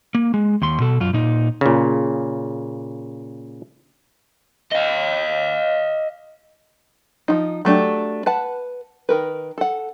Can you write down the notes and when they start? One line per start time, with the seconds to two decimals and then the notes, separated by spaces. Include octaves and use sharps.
0.15 A#3
0.34 G#3
0.62 D#2 C6
0.80 B2 A4
1.00 F#2 F4
1.13 A#2 D#4
1.61 A#2 C#3
4.72 D#5 F5
7.28 F3 F#3 D#4
7.65 F#3 A3 D4 G4
8.26 B4 F#5 A5
9.09 D#3 A#4 B4
9.58 A4 F#5